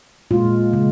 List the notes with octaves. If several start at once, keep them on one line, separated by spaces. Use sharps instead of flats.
A#2 G#3 F4
C#3 G#3